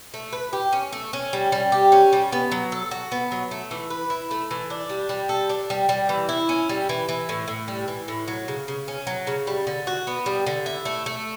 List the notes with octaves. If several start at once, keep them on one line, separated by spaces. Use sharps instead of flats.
A3
B4
G4
C#4
A3
C#4
G3
G3
G4
C#4
G3
B3
F#3
A4
F#4
B3
F#3
A3
E3
B4
E4
A3
E3
D4
G3
G3
A4
D4
G3
G3
E3
E4
C#4
G3
E3
E3
A2
A2
G3
E3
A2
F#3
C#3
C#3
C#4
F#3
C#3
G3
D3
F#4
B3
G3
D3
E4
A3
A3